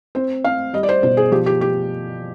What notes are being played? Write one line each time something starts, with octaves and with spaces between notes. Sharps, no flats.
C4 C5
C4 F5
G3 D#5
D5
C5
B2 C5
G#4
F3 G4
G4
G4